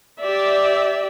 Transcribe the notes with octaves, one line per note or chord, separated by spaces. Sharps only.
G4 D5 E5